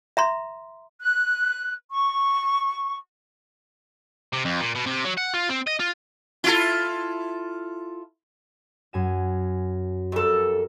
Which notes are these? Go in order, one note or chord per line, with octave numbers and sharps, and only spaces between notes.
E5 A#5 C6
F#6
C#6
C3
F2
A#2
B2
C3
F#3
F#5
F4
C4
D#5
F4
E4 F4 A4
F#2 G#5 E7
F2 G4 A4 A#4